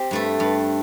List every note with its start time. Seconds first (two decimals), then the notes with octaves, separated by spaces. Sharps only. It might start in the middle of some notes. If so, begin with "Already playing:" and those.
Already playing: C4 G4 C5
0.11 G2 A3 A4
0.40 G2